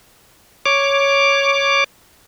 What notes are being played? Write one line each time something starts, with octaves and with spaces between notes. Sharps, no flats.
C#5 D6